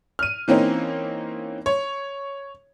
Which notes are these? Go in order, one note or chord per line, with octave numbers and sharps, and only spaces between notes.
F6 D#7
E3 A#3 C4 C#4 D#4
C#5